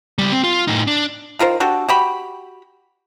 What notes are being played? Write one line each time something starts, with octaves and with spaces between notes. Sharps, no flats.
C#2 G3
C4
F4
A2 D#4
D4
D#3 F4 A#4 C5
D4 F#4 G4 A4
F#4 G4 B5